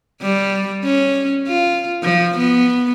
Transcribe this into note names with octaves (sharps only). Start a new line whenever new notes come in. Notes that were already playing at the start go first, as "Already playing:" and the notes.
G3
C#4
F4
F3
B3